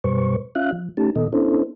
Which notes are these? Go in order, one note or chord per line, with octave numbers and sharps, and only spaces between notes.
F#2 B2 G3 B4 C5 C#6
C#4 F4 E5 F5 F#6
F3
A3 C#4 D#4 G4 A5
A#2 D#3 B3 A4 D#5
B3 C#4 D4 E4 A4 C5